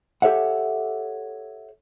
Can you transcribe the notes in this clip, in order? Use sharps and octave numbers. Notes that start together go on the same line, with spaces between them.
G4 A4 C#5 E5 F#5